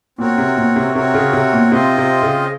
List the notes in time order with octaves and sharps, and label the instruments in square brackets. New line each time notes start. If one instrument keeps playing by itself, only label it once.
[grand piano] A#2 [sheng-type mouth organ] C4 F#4 A#4 C#5
[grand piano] C3
A#2
C3
[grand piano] C3 [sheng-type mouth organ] C4 F#4 A#4 C#5
[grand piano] C#3
C3
A#2
[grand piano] C3 [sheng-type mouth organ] C4 F4 C5 D#5
[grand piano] C3
C#3